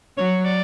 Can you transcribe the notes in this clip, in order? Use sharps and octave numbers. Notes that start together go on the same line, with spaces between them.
F#3 C#5
D5